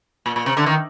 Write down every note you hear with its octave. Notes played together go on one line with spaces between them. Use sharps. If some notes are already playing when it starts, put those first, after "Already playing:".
A#2
A#2
C3
D3
D#3